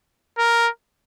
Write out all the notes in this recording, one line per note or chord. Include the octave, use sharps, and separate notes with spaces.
A#4